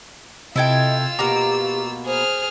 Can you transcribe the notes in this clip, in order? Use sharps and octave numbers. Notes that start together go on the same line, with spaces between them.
C3 E4 F4 A4 D#5 G5 E6 G#6
B2 A#3 G4 A#5 D6
G#4 C5 F6